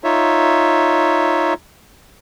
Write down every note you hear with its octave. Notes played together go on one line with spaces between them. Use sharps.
D#4 F4 C#5 E5